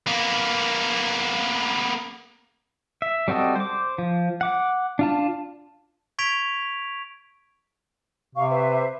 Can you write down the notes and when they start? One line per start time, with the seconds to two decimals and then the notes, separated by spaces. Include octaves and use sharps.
0.06 A#3 B3
3.02 E5
3.28 G3 C4 F#4 A4 D#5
3.56 C5 D6
3.98 F3
4.41 F#5 D6
4.99 D4 F4 A5
6.19 C#6 G#6 B6 D7 F7
8.35 C3 F5 C#6
8.48 B4 C5 E5